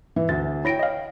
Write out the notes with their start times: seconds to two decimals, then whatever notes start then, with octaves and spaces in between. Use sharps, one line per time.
0.16 E3
0.29 D2 A6
0.65 E4 C#5 G5 A#6 D7
0.79 D#5 F5